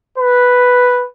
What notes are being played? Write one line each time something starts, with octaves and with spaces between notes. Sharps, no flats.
B4